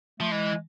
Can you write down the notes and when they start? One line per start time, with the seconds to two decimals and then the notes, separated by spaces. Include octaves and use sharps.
0.20 F3 A3
0.32 E3 G#3